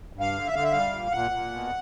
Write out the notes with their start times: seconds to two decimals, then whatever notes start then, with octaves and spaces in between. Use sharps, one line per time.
0.13 G2
0.20 F5
0.33 D3
0.46 E5
0.53 D3 F5
0.63 E5
0.72 G3 F5
0.92 A#2
1.12 A#2 F#5
1.31 A#2
1.51 B2